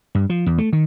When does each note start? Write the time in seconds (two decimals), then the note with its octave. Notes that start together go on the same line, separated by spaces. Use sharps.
0.15 G2
0.30 F3
0.46 E2
0.58 A3
0.73 D#3